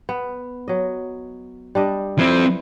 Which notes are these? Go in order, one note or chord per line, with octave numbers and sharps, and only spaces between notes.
B3
F#3 D#5
G3 D4 D#5
F3 C4 E4 B4